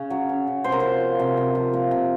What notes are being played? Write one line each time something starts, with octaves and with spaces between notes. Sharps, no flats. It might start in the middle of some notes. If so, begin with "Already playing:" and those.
Already playing: C#3 C#4
F#3
C#4
C#3
C3 C5
A#4
F3 C5
A#3
C3
C3
F3
A#3
C3